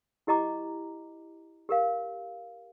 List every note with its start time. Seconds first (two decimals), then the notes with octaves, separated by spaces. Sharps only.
0.27 E4 G4 D#5 A#5 D6
1.69 G4 A#4 F5